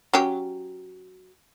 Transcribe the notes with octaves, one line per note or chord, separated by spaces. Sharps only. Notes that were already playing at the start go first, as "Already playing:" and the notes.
F#3 C#4 G4